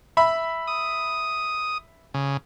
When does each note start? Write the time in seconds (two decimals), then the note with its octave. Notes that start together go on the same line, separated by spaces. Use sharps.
0.17 E5 B5
0.67 D#6
2.14 C#3